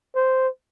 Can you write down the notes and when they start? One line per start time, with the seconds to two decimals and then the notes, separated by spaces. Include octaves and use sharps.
0.15 C5